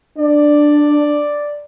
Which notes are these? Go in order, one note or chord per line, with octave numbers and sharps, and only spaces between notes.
D4 D5